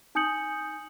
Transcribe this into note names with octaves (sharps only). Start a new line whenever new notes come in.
D#4 G#5 D#6 G6 C#7 F#7